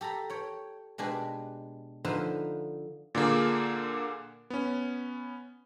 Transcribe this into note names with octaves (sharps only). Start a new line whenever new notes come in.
G4 A4 A#5 B5
C#5 G5
B2 G#3 D4 G4 B4 G5
D3 F3 D#4 B4 C5 E5
A#2 D3 A#3 G#4
B3 C#4